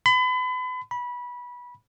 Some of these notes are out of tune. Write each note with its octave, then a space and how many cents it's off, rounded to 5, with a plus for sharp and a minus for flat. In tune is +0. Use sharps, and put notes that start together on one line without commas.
B5 +35
B5 -20